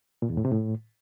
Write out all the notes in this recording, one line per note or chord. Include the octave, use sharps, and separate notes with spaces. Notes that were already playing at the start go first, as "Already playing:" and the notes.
A#2
E2
A2
C3
A2